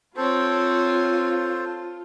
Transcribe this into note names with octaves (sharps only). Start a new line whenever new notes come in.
C4 F4 A4 C5 C#5